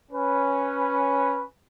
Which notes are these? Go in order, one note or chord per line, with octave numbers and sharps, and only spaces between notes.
C#4 B4